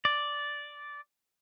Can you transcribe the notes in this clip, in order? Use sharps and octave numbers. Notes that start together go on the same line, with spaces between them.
D5